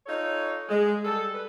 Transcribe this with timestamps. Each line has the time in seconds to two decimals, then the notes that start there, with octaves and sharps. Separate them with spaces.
0.06 D#4 F4 A4 C#5
0.69 G#3
1.04 G3 A4
1.34 B4